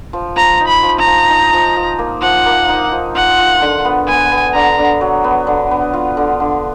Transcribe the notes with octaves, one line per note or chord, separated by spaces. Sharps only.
F3
F3 A#5
D#4
B5
F3
A#5
F3
D#4
F3
F3
A#3
F3 F#5
A#3
D#4
F3
F4 F#5
F4
D3
B3
B3 G#5
B3
D3 A#5
D3
F#3
B3
D3
B3
F4
D3
D3